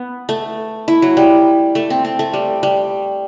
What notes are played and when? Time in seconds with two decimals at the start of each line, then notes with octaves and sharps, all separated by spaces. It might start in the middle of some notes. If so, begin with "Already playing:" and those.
Already playing: B3
0.29 A3
0.88 E4
1.02 F#3
1.17 G3
1.75 A3
1.90 C4
2.05 C4
2.19 A3
2.33 G3
2.63 G3